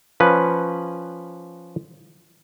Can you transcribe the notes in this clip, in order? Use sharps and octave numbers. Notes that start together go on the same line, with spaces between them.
F3 C#4 B4